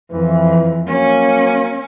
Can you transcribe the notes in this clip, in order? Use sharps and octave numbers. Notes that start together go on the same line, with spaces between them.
F2 E3
F#3 A#3 C#4